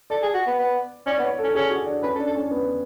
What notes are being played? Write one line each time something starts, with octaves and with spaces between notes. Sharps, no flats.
A4 D5
G#4
F#4
B3
B3
C#4 D5
B3
C#5
C#4 A4
C#4 G#4
F#4
D4
C#4 B4
A4
D4
A4
C#4
B3